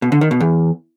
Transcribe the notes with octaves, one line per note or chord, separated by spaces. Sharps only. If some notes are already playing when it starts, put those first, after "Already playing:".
B2
D3
D#3
B2
E2